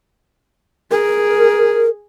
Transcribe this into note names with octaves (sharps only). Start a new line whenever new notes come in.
G#4 A#4